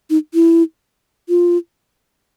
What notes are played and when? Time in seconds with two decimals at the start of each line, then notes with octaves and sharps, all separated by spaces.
0.10 D#4
0.34 E4
1.29 F4